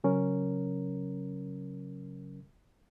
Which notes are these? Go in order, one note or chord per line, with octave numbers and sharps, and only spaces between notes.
C#3 F#3 C#4 A#4